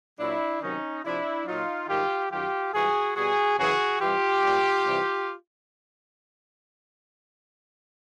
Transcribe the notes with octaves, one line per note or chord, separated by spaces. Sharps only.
A#2 F#3 D4 E4
C3 D#3 F#3 C#4 D#4
C3 F3 D4 E4
A#2 F#3 D#4 F4
G#2 D#3 G3 F4 G4
F#2 D#3 F#3 F4 G4
G#2 E3 G3 F#4 G#4
B2 G3 F#4 G#4
F#2 C#3 E3 F#4 G#4
C3 E3 G3 F4 G4
A#2 G3
C3 E3 G3